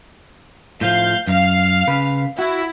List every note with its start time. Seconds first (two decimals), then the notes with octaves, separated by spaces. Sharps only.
0.81 A2 F3 F5 G6
1.27 F#2 F5
1.87 C#3 B4
2.39 E4 F#4